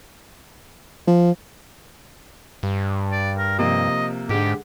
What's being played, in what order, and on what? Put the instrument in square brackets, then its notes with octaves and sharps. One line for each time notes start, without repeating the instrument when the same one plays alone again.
[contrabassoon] F3
[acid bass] G2
[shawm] D5
A#4
[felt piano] C3 F3 A#3 [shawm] D#5
[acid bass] G#2 [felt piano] D3 G#3 [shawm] G4